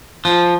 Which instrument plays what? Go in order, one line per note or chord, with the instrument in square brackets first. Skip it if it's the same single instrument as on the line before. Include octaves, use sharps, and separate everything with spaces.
[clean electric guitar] F3